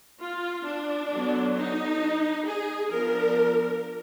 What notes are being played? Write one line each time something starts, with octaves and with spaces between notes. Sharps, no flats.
F4
D4
D3 F#3 B3
D#4
G#4
F3 B3 D4 A#4